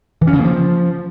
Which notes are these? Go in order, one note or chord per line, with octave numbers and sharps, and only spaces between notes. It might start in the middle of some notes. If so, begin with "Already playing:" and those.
E3
C#4
C#3
A#3
F3